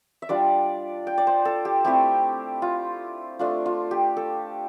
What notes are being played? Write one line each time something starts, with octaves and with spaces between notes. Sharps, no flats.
E5
G3 D4 F4 D5
G5
D5
C5
A4
G4
A3 C4 E4 G4
F4
A3 D4 F4
F4
G4
A4